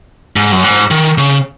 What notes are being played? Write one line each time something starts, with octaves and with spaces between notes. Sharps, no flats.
G#2
F#2
G#2
D#3
C#3